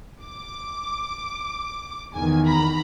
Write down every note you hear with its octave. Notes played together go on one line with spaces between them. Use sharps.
D6
E2 D#3 G#5
A#5 B5